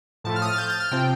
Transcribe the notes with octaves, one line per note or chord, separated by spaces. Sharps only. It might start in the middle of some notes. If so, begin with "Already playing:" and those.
A2 F3 A3 A5
F6
D#6
F6
A6
G6
A6
F6
C3 F3 C4 G5